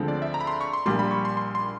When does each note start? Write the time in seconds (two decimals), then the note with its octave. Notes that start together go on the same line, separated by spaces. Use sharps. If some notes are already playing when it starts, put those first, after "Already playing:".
Already playing: D2 D3 F3 G#3 C4
0.08 D5
0.22 E5
0.34 A#5
0.41 B5
0.47 C6
0.61 C#6
0.73 C6
0.86 A#1 A#2 G3 A#3 C6
0.99 B5
1.11 C#6
1.25 C6
1.37 C6
1.55 C6